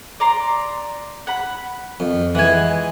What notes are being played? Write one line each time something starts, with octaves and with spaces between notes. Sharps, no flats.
D5 A#5 C6
F#5 B5
F2
E3 G#3 F#5 G#5